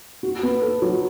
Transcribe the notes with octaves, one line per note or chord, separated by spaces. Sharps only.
F#4
B3
A4
F#3